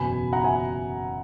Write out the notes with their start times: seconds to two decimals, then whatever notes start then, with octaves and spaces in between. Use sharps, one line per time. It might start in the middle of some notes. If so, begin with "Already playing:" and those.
Already playing: F#1 E2 B2 G#5 B5
0.33 F#5 A#5
0.44 E5 G#5